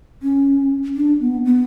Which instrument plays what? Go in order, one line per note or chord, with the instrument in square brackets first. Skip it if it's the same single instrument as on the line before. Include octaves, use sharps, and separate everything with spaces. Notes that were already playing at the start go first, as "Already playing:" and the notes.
[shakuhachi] C#4
D4
B3
B3